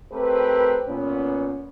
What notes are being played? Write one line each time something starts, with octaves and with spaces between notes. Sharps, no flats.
A3 C4 G4 A#4 B4
A#2 B3 C#4